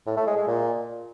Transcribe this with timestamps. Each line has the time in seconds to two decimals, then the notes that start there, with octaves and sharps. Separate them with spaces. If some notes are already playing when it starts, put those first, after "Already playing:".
0.07 A2
0.17 A3
0.27 G#3
0.37 G#3
0.47 A#2